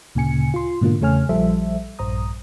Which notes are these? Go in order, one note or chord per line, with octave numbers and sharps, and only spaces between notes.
D2 A#2 C#3 G#5 C#7
F4 C6
G#2 B2 D3 A#3 F4
E2 C#3 A3 C#5 G#5 F6
A#1 F3 G3 A4 C5 E5
A#1 G2 C5 A#5 D#6